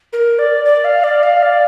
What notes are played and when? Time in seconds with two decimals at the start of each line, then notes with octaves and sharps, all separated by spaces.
0.13 A#4
0.39 D5
0.65 D5
0.84 F5
1.04 D5
1.23 F5
1.43 D5